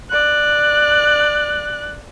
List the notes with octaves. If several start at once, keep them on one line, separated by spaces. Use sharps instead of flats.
D5 F#6